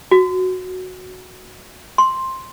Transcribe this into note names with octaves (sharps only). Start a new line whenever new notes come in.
F#4
C6